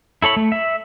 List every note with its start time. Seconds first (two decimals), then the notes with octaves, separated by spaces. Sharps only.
0.22 E4 A4 C#5 B5
0.37 A3
0.52 E5